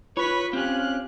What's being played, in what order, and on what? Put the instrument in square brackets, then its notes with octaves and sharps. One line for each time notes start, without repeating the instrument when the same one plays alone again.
[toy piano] F4 [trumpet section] B4 [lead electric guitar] C#5 [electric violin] C#6 B6
[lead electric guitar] C4 C#4 [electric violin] G4 F#6 [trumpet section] F5